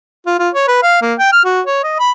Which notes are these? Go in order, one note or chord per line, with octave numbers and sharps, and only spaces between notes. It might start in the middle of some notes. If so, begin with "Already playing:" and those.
F4
F4
C#5
B4
F5
A#3
G5
F6
F#4
C#5
D#5
B5